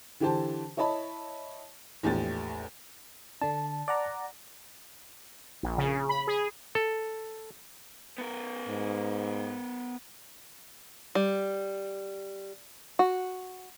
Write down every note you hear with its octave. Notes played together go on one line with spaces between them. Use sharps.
D3 E3 G4 C5 A5
E4 C#5 D#5 A5 B5
A#1 E2 A2 G4 A6
D3 D4 A5
D5 F#5 A#5
A#1
C#3
B5
G#4
A4
B3 A#4
G#2
G3
F#4